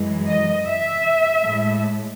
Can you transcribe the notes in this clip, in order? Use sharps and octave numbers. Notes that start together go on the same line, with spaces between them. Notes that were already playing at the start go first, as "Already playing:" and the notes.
Already playing: F#2 E3 G#3
D#5
E5
A2 G#3